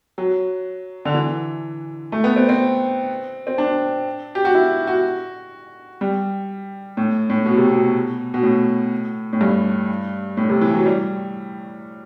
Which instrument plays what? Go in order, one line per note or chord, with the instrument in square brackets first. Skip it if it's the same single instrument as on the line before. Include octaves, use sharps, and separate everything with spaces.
[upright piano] F#3
D3
E3
A3
B3
C4
C4
C4
D4
G4
F#4
E4
F#4
G3
A2
A2
B2
C3
B2
B2
A2
A2
G2
A2
C3
E3
F#3
G3